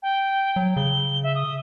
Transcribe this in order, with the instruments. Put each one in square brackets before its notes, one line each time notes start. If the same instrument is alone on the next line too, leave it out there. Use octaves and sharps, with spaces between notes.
[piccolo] G5
[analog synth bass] F#3
[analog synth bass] C#3 [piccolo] G7
[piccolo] E5
D#6